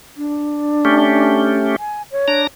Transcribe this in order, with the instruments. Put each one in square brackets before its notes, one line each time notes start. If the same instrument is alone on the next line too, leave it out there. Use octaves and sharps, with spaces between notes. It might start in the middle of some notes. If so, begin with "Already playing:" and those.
[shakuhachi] D4
[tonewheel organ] A3 C#4 G4
[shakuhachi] G#5
C#5
[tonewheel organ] D4 A#5